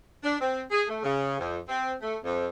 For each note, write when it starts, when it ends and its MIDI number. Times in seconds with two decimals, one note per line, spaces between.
0.23 0.36 62
0.41 0.62 60
0.71 0.82 68
0.88 0.99 57
1.03 1.39 49
1.39 1.58 41
1.68 1.92 60
2.01 2.16 57
2.24 2.47 41